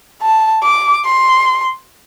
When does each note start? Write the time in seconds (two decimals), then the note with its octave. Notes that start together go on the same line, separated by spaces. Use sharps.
0.22 A5
0.63 D6
1.06 C6